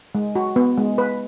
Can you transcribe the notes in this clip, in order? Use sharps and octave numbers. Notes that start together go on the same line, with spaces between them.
G#3
F#4
B3
G#3
B4